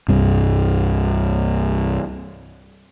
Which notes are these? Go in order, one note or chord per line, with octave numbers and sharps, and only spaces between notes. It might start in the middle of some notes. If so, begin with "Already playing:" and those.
C2 G2 C3